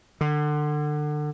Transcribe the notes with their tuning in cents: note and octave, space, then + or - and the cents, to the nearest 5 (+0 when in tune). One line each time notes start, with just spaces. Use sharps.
D3 +30